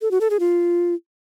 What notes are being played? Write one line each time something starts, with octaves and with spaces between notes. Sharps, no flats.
A4
F#4
A4
G#4
F4